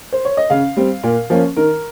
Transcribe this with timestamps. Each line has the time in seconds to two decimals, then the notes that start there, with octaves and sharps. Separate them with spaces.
0.12 C5
0.25 C#5
0.37 D#5
0.50 C#3 F5
0.77 G3 C4
1.03 A#2
1.30 F3 A#3 C#4
1.56 D#3 A#4